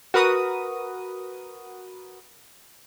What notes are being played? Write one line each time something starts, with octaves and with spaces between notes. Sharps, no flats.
F#4 A#4 B4 D#6